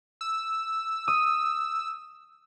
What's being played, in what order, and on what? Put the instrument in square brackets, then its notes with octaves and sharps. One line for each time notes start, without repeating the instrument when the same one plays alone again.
[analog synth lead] E6
[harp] D#6